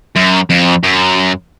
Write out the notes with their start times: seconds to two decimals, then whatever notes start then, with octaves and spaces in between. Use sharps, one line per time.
0.16 F#2
0.50 F2
0.84 F#2